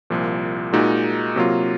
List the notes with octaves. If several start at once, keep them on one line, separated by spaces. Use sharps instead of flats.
C2 A#2 F3
A#2 G#3 D#4 F#4
C3 F#3 A#3 F4